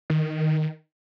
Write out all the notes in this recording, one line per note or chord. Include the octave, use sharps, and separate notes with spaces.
D#3